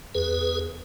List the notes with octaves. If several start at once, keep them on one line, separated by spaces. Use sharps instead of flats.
E2 G#4 B4